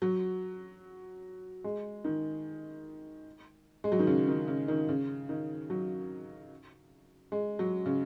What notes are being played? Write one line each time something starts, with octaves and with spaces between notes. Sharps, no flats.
F#3
G#3
D#3
G#3
F#3
D#3
C#3
D#3
C#3
D#3
C#3
D#3
F#3
G#3
F#3
C#3